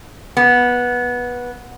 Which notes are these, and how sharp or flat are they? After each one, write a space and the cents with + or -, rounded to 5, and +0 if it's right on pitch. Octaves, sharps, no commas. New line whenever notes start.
B3 -15